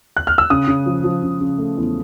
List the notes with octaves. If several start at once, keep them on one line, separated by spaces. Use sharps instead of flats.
F#6
F6
E6
C#3 D#6
C#3
F3
F3
C#3
C#3
A3
E2